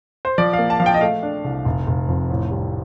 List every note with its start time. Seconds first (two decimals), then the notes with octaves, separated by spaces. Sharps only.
0.25 C5
0.38 F3 D5
0.53 F5
0.58 A#3
0.70 A5
0.80 F3 F5
0.86 G5
0.94 D#5
1.01 A3 F5
1.23 D4
1.44 C2
1.65 F1
1.87 F1
2.09 F2
2.30 A1
2.51 G3